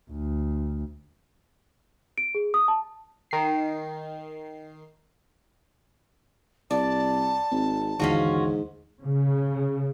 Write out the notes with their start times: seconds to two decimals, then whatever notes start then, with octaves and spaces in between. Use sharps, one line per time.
0.11 D2
2.18 D7
2.35 G#4
2.54 D#6
2.68 A5
3.31 D#3 C7
6.71 C2 D5 A5
7.52 G#1 C4
8.00 D#2 G#2 D3 E3 C#4 F4 F#4
9.03 C#3